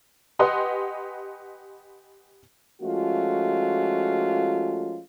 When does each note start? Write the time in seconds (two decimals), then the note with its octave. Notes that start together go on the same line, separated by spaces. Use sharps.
0.39 G4 B4 D#5 F#5 G#5 C6
2.82 F3 G#3 A3 C#4 F4 F#4